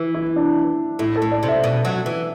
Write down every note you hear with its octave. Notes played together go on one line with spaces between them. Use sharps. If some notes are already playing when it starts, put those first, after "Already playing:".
Already playing: E3
E4
D4
A2 E4
A4
A2
D5
C3
E5
B2
F#3
E3